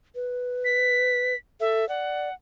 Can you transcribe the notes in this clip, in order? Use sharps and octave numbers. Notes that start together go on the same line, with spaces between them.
B4
B6
A4 E5
D5 F#5